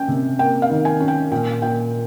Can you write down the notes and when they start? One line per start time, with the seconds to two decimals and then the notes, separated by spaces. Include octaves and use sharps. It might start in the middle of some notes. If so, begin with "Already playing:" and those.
Already playing: C#4 G5
0.08 C3
0.39 A#3 G5
0.62 F5
0.70 D#3
0.85 G#5
1.00 C#4
1.08 G5
1.31 A#2 G5
1.62 A#2 G5